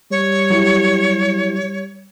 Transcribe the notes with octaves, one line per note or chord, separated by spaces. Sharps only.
G3 C#5
F#3 E4 G4